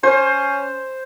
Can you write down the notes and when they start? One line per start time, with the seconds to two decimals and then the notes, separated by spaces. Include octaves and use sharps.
0.03 C#4 C5